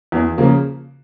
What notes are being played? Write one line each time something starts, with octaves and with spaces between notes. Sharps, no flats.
E2
C#3 F3 A#3